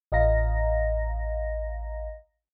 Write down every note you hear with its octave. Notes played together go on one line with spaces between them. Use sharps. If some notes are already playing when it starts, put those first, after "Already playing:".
A1 D#5 F5 A#5 A#6